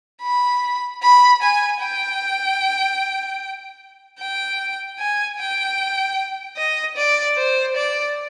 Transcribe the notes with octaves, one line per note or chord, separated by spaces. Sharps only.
B5
B5
G#5
G5
G5
G#5
G5
D#5
D5
C5
D5